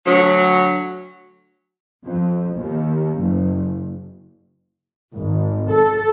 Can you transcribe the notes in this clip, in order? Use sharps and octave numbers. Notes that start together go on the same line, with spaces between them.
D2 F#3
F2
D#2
F#1
G#1
A4